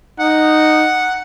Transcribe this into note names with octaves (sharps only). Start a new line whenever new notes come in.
D#4 F#5